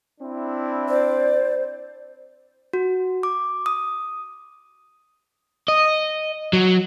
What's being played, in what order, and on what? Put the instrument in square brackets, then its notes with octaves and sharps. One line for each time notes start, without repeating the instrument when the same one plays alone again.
[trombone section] C4 D4 E4
[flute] C5 [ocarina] D5
[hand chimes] F#4
D6
D#6
[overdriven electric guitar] D#5
F#3